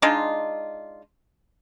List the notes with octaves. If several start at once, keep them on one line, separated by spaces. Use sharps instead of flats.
G#3 D4 D#4 F4